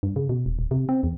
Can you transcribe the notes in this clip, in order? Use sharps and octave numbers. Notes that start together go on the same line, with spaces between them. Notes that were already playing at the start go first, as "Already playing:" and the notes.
G2
C#3
B2
D#1
D#1
C3
C4
E2